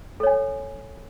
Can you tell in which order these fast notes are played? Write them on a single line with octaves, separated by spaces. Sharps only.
A4 C#5 G#5